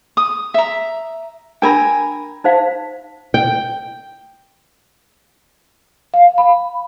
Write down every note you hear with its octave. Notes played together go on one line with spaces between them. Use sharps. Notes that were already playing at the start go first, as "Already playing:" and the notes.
D#6
E5 A#5
D4 A#4 G5 G#5 A#5 B5
D#4 C5 F5
G5
F5
B5